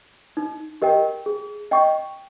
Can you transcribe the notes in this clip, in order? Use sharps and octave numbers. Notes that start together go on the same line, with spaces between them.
D#4
G4 A#4 D#5 G5
G#4
D#5 G5 C#6